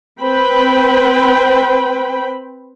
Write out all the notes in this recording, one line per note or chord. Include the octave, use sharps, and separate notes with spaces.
C4 B4 C5 G5 B5